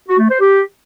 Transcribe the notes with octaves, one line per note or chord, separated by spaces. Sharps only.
F#4
A3
C5
G4